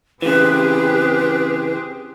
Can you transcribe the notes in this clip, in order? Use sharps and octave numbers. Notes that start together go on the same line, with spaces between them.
C#3 E3 C4 G4 G#4 B4